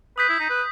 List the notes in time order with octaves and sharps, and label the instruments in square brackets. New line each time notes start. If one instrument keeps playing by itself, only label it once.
[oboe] B4 [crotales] D#6 G6 B6
[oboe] E4
D#4
B4